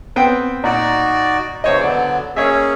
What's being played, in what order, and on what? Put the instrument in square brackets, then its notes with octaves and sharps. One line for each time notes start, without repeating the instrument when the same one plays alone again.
[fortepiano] B3 C4 G5
[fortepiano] A#2 F#5 [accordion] D#4 F#4 D5
[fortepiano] C#2 C#5 D#5 [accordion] E3 C5
[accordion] D3 F#3 B3 [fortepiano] D5
[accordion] A#3 C#4 G#4 [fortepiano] C#5 D#5 E5